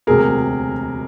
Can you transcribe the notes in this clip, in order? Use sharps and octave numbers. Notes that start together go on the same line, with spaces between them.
E1 D2 C3 G#4 A#4